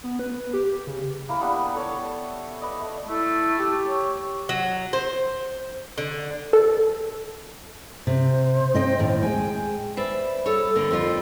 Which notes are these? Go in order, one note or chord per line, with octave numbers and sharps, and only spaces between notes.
B3
B4
G4
C#3
A#3 E4 A#4 G#5
G3 B3 D4 G4
A4 B4 C#5 A5
B4 D5 D#5
A3
A3 E4
G4
C#5
F#3
C5
D3
A4
C3 C5
C4 D#5 G5
D#2 A2
G#3 G5 G#5
B4 C5 D5 E5 B5
G3 A4 C#5 B5 E6
D3 A#3
F2 D3 F4